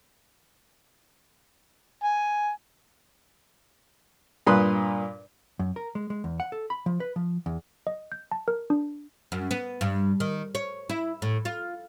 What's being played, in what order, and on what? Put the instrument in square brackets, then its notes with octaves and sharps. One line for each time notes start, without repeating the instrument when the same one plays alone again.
[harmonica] G#5
[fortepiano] G2 A#2 B4 C6 D#6 F#6
[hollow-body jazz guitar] F#2
A#4
G#3
G#3
E2
F#5
A4
B5
F3
B4
F3
E2
[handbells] D#5
G6
A5
A#4
D4
[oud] F#2
B3
G2
D#3
C#5
E4
A2
F4